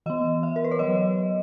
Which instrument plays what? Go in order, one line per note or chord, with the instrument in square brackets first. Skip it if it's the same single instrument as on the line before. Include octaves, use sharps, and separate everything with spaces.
[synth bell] E3 B3 D#5
E5
A#4
B4
C#5
F#3 B3 D#5